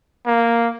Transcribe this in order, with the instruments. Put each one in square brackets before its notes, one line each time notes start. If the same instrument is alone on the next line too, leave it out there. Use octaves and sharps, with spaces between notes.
[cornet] A#3